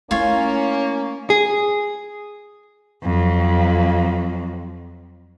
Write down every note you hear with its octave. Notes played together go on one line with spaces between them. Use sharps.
A3 A#3 C#4 E4 F4 C#5
G#4
F2 F#3